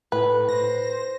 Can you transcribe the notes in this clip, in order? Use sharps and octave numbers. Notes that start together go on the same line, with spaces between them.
A2 B4
C5 A#6